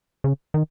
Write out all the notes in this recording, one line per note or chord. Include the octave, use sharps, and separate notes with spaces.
C#3
D#3